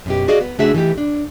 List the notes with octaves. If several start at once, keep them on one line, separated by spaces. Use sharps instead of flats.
F#2 B2 G4
F#4 G#4 D5 D#5 F5
B3
C#3 A3 D4 F#4 G#4 E5
E3 A3 D#4 G4
D4